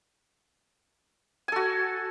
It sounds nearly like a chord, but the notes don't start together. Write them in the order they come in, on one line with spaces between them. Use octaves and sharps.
G#5 A4 F#4